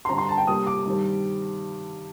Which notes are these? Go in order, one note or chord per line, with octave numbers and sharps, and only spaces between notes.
C6
G2 D3 G3 C4 A#5
C6
A5
G5
C3 G3 A#3 D#6
D6
G2 D#3 G3 C4